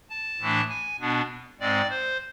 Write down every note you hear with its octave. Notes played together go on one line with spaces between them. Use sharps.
A5
A2 E3 A3 D4
G#5
B2 B3 D4
G#2 G#3 C4 D5
C5